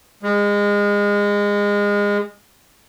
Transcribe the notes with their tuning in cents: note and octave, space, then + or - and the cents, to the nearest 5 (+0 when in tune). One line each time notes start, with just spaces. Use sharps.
G#3 -25